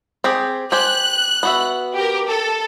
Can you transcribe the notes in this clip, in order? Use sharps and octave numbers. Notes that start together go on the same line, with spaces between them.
C4 G4 G#4
G4 C5 G#5 F#6
B3 F#4 E5
G4 A#4
A4